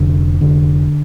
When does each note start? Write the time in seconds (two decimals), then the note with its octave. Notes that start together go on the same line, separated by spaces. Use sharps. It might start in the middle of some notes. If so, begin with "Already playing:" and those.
Already playing: F1 D3
0.41 D3